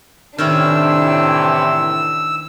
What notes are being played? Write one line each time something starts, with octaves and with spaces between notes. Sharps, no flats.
A2 C3 D#3 E3 C#4 D4 E4 E6